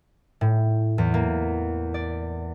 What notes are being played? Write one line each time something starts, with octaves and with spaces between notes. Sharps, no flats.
A2
E2
A#3
D5